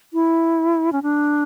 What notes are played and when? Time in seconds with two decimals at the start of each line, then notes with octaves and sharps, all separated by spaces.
0.13 E4
0.93 C#4
1.03 D4